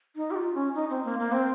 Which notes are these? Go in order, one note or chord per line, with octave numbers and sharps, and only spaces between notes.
D#4
G4
F4
C#4
D#4
C4
A#3
A#3
C4